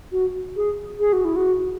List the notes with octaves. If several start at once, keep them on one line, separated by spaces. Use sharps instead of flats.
F#4
G#4
G#4
F#4
E4
F#4